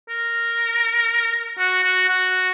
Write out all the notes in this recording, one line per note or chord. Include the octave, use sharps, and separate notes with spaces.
A#4
F#4
F#4
F#4